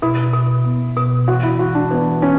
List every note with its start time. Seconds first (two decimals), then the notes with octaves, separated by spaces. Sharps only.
0.02 B2 E4
0.33 B2
0.65 B3
0.97 B2
1.27 E3 F#4
1.43 E4
1.59 E3 F#4
1.75 D4
1.91 E3 B3
2.22 E3 C#4